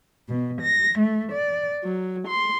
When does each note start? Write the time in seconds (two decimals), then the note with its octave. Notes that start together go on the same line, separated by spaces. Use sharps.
0.29 B2
0.60 A#6
0.99 A3
1.31 D5
1.83 F#3
2.26 C6